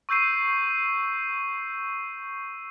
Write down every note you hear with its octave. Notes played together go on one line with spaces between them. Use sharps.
C#6 E6 G6 C7 D#7